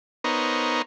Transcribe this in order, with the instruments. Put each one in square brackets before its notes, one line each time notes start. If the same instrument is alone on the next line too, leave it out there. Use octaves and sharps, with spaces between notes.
[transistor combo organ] B3 D#4 A#4 C5 C#5